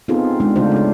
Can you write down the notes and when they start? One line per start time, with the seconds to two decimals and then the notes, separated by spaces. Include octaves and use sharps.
0.08 B3 C4 D#4 F4 G#4 A4
0.40 G#3 D4 D#4
0.56 C#3 A3 D4 F4 C5
0.72 C#4 D4